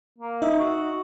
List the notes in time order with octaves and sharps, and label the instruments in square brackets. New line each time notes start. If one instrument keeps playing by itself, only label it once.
[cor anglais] A#3
[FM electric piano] D#4 D#5 E5
[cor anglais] F#4